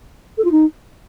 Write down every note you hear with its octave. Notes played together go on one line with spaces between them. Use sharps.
A4
F4
D#4